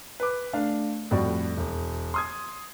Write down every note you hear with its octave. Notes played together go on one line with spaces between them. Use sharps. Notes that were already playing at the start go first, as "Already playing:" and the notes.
B4 D6
A3 D4 F5
F2 A2 G3 F#4 D5
E1
C6 D#6 G#6